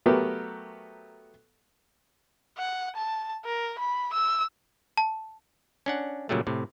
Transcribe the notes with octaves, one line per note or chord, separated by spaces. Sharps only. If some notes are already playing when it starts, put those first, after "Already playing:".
F#3 A3 B3 G4 A#4
F#5
A5
A#4
B5
E6
A5
C#4 D4 F#5
A#2 C#3 F#3 G3 A3
A2 C3